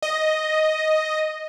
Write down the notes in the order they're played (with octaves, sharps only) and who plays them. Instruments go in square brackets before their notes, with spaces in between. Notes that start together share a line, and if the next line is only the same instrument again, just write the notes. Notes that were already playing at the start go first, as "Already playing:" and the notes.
[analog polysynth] D#5